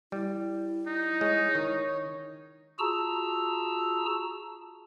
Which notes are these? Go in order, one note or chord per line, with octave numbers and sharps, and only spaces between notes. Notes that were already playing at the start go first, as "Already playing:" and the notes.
G3 E4
D#4
G#3 C#5
D#3
F4 F#4 G#4 A5 A#5 E6